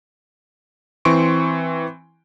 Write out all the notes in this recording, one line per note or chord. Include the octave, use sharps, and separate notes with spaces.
E3 C4 C6 C#6 D7